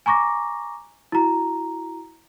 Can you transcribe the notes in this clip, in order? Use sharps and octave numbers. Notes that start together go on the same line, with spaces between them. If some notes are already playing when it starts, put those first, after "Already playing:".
G#5 A#5 C#6 D6 A#6
E4 F#4 A#5